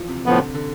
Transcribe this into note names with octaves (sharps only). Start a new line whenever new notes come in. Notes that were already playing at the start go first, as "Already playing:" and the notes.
Already playing: E3 F3
C3
A2 D3 F3 B3
C3
D3